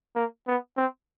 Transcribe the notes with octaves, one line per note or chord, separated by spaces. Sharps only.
A#3
B3
C4